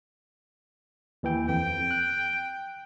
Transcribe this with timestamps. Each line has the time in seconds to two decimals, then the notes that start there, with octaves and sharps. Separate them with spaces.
1.23 D#2 E3 G5
1.49 F2 G5
1.91 F#6